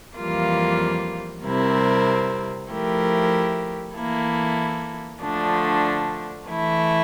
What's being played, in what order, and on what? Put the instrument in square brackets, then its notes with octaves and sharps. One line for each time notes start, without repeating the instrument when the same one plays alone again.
[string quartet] F2 E3 G3 A#3 F4
C3 G3 C4 E4 A#4
F3 A3 E4 G4 A#4
E3 A#3 E4 A4
D3 F3 A3 D4
E3 A3 E4